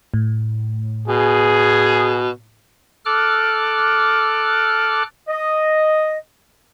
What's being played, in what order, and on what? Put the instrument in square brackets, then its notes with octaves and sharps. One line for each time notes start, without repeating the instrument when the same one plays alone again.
[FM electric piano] A2
[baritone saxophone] B2 [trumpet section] G#4
[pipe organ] A4 D6 F6 F#6
[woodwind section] D#5